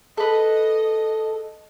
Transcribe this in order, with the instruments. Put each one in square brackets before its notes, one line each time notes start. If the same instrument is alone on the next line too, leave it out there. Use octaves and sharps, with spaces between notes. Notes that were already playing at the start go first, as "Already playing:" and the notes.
[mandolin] A4 B4 [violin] D#5